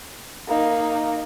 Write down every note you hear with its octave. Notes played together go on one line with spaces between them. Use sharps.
A#3 D#4